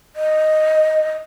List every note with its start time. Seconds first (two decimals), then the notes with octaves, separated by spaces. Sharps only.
0.16 D#5